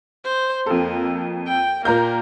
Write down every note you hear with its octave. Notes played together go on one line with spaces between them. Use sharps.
C5
F2 A#3 A4
G5
A#2 A#3 A#5 G6